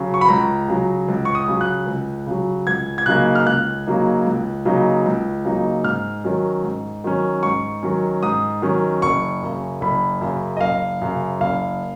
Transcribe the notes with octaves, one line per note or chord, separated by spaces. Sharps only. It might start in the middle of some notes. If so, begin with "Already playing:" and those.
Already playing: C#3 F#3
C#6
B5
C#2 A#5
C#3 F#3
C#2
C#6
D#6
C#3 F#3
F#6
C#2
C#3 F#3
C#2 G#6
G#6
C#3 F#3 A#3 D#4 F#6
F6
C#2 F#6
C#3 F#3 A#3 D#4
C#2
C#3 F#3 A#3 D#4
C#2
C#3 F#3 A#3 D#4
G#2 F6
D#3 F#3 C#4
G#2
D#3 F#3 C#4
G#2 C#6
D#3 F#3 C#4
G#2 D#6
D#3 F#3 C#4
F#1 C#6
F#2 C#3
F#1 B5
F#2 C#3
D#5
F#1 F5
F#2 C#3
F#1 F5